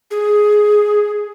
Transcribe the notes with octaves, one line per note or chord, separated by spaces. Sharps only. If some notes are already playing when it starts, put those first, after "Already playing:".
G#4